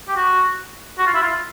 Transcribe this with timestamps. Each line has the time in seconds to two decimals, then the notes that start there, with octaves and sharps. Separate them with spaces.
0.08 G4
0.16 F#4
0.99 F#4
1.06 F4
1.14 E4
1.22 F4